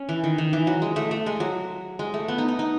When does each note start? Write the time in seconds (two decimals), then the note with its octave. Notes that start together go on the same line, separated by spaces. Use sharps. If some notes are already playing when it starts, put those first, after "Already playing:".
Already playing: C#4
0.09 E3
0.24 D#3
0.38 D#3
0.53 E3
0.67 F#3
0.82 G#3
0.96 A3
1.11 A3
1.26 G#3
1.40 F#3
1.99 G#3
2.14 A3
2.28 B3
2.38 D#4
2.48 D#4
2.59 D#4